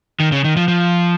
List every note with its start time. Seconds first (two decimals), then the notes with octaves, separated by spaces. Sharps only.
0.20 D#3
0.32 C#3
0.44 D#3
0.57 F3
0.68 F3